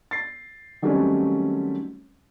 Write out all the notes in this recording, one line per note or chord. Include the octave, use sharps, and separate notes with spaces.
A6 C7
D#3 F#3 G3 A3 C4 C#4